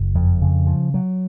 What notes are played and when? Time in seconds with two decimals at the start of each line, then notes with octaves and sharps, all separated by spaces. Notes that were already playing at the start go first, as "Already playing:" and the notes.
Already playing: F#1
0.15 F2
0.42 C#3
0.67 F3
0.94 F#3